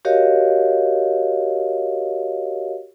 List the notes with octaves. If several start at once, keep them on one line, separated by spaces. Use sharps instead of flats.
F#4 G4 A#4 C#5 D#5 F5